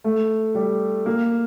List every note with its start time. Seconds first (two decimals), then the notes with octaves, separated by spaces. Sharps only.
0.04 A3
0.55 G3
1.06 A#3